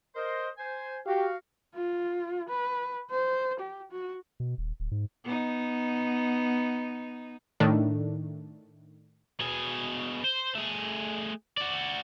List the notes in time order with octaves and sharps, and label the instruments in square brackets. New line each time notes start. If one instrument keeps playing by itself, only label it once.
[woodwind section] A#4 C5 D#5
C5 G#5
[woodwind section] F#4 F5 [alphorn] G4
[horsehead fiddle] F4
B4
C5
G4
F#4
[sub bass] B2
D#1
D1
G#2
[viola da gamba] B3 D#4
[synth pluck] A2 D#3 A3 D4
[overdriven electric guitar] B2 G#4
C5
A3 G#4
F#4 D5